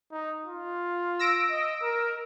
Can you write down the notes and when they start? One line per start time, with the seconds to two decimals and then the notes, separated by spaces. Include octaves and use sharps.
0.12 D#4
0.45 F4
1.19 E6 A#6 D7
1.51 D#5
1.83 A#4